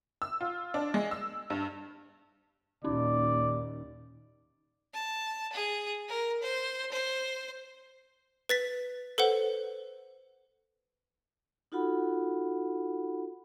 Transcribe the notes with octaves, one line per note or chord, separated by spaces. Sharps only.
E6
F4
D4
G#3
E6
G2
D#2 A#2 C#4 D#4 D5
A5
G#4
A#4
C5
C5
B4 A6 B6
A4 B4 C5 F#5
D#4 F4 F#4 A4 F#5 B5